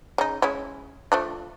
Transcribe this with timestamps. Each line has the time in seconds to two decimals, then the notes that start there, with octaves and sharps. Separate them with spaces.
0.18 C#3 D#4
0.42 G#3 C#4 E4
1.12 F3 A3 D4